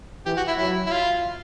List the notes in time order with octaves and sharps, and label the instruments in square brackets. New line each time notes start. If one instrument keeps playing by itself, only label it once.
[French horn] E3 [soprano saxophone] G4
[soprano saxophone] F#4
E4
[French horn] F#3 [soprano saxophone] E4
[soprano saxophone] E4
F4